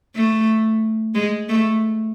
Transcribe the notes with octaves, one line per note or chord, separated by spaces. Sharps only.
A3
G#3
A3